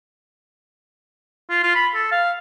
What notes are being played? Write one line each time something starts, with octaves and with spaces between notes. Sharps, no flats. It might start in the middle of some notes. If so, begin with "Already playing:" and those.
F4
F4
B5
A4
F5